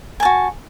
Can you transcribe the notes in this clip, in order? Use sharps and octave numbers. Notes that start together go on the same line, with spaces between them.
F#4 G#5 A5